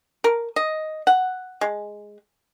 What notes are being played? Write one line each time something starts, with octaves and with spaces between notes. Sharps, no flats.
A#4
D#5
F#5
G#3